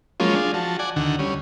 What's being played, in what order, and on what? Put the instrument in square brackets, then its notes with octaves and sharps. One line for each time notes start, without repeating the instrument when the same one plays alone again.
[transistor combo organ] F3 F#3 G#3 A#3 C#4 F4
D4 F4 G#4
F3 F#4 A5
D5 F#5 G#5
D2 D3 D#3 F#5
D2 G3 C#4